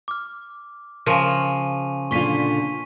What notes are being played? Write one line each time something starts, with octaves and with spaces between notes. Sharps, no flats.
D6 F6
C#3 F3 C#4 A#4 G#5 C#6 D#7
A#2 D3 F4 C#6 B6 D#7